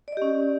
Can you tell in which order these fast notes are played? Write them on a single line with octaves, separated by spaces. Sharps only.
D5 D#5 G4 C#4